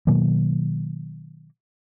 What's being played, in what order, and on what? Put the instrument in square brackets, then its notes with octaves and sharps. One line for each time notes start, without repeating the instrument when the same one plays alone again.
[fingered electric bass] B2 D#3 F#3 A#3